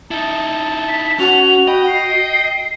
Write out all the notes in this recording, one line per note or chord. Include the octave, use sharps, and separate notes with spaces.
D#4 E4 A5
B6
C#4 F#4 F7
D#5 G5 B5
C7